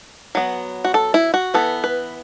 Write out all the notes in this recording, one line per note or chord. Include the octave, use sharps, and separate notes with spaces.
F#3 B3
F#4
A4
E4
F#4
E3 B3 A4
B4